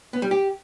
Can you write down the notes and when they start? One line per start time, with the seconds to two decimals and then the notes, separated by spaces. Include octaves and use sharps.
0.13 B3
0.22 G3
0.31 G4